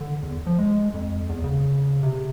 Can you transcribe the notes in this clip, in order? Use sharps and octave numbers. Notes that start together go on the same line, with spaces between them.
D3
E2
F3
G#3
F2
E2
C#3
C3